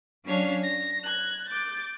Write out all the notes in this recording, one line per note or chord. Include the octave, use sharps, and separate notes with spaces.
F#3 C#4 D4 C#5 F5
A#6
F#6 G#6
D6 G6 A6